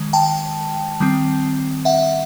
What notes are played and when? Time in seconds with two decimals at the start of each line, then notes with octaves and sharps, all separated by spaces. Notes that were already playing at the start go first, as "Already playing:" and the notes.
Already playing: D#3 G#3
0.13 G5 A5
1.00 D#3 G3 C4
1.85 E5 F#5